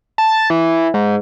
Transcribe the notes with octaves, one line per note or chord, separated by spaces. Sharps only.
A5
E3
G#2